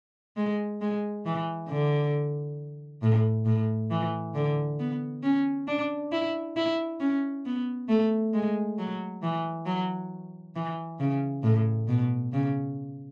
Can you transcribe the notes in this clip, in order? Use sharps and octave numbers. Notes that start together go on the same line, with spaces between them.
G#3
G#3
E3
D3
A2
A2
E3
D3
B3
C#4
D4
E4
E4
C#4
B3
A3
G#3
F#3
E3
F#3
E3
C#3
A2
B2
C#3